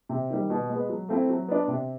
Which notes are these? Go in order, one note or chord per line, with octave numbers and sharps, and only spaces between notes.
C3
D#3 G3
B2
G#3 B3
F#3
A3 C4 E4
F#3
B3 D4
C3